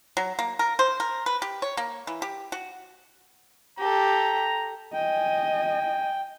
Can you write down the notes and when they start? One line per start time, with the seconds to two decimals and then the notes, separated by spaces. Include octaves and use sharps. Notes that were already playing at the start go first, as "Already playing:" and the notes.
0.17 F#3
0.39 A#3
0.59 A#4
0.79 C5
1.00 A#4
1.26 B4
1.42 G4
1.62 C#5
1.77 A#3
2.07 E3
2.22 G4
2.52 F#4
3.78 G4 A4 A#5
4.94 D#5 G5 G#5